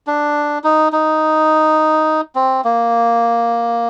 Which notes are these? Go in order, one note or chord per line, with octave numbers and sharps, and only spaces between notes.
D4
D#4
D#4
C4
A#3